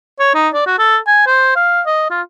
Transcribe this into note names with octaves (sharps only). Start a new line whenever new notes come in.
C#5
D#4
D5
F#4
A4
G#5
C5
F5
D#5
F4